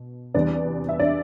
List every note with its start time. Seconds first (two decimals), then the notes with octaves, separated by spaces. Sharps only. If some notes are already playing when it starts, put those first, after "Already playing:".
Already playing: B2
0.34 E2 C3 G3 B3 D4 D5
0.89 E5
1.00 D4 D5